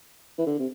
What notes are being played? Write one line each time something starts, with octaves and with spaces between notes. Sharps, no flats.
E3
D3
C3